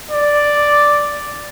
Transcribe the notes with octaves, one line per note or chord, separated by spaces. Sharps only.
D5